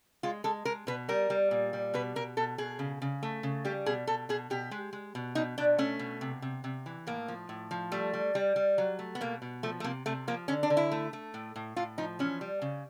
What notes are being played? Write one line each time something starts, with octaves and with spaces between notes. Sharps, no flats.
G#3 F4
G#3 A4
G#3 A#4
B2 B4
G3 A#4
G3
A#2
G3
B2 B4
B2 A#4
B2 A4
B2 G#4
C#3
C#3
A3
C#3
G3 G4
B2 G#4
B2 A4
B2 G#4
B2 G4
G#3
G#3
B2
B2 D#4
B2 D4
A3 C#4
B2
C3
C3
C3
E3
A2 A#3
F3
A2
F3
G3 A3
G3
G3
G3
F#3
A3
B3
B2 A#3
B2
F3 A3
A3
C3 A#3
C3 A3
F3 A#3
D3 C#4
D4
D3
E4
A3
A3
A2
A2
A2 F4
F3 D#4
E3 C#4
G3
C#3